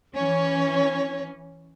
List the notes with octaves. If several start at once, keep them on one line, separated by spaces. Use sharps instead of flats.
E3 C#4 C#5